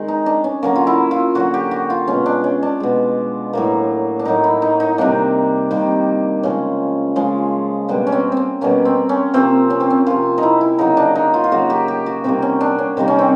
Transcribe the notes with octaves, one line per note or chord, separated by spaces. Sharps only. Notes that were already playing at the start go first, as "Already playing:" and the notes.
Already playing: D#3 G#3
D#4
D4
C#4
D3 F#3 A#3 C#4
F4
E4
F4
D3 F#3 A#3 F#4
G4
F#4
F4
B2 G#3 C#4
D4
C#4
D4
B2 G#3
A2 F#3 A#3
D4
A2 F#3 A#3 D#4
E4
D#4
D#4
C3 D#3 G3 A#3 D4
C3 D#3 G3 A#3
C#3 F3 G#3 C#4
C#3 F3 G#3
B2 G3 A#3 D4
C#4
C4
C4 C#4
B2 G3 A#3 C#4
C4
C#4
C3 F3 A#3 C4
C#4
C4
C#4
C3 F3 A#3 F4
D#4
E4
E4
C#3 F#3 A#3 D#4
D4
D#4
F4
F4
C#3 F#3 A#3 F#4
G4
G4
F#4
C3 D#3 G3 A#3 C4
C#4
D4
C#4
C3 D#3 G3 A#3 C4
C#4
C4